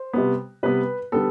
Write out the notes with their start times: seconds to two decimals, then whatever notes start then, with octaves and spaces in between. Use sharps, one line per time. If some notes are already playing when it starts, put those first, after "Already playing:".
Already playing: C5
0.13 C3 G3 B3
0.63 C3 G3 B3 B4
1.12 D3 G3 B3 A4